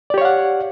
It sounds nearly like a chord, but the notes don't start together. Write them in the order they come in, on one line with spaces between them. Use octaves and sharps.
D5 G4 C#5 F5 F#5